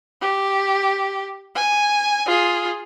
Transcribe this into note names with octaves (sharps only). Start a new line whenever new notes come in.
G4
G#5
F4 G#4